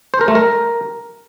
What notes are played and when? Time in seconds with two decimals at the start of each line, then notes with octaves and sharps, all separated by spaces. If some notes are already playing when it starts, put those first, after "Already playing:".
0.14 C5
0.21 A#4
0.28 A3
0.35 A#4